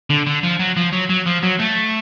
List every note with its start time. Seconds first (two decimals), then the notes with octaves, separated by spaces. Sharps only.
0.10 D3
0.27 D3
0.43 F3
0.59 F#3
0.77 F3
0.93 F#3
1.10 F#3
1.26 F3
1.43 F#3
1.60 A3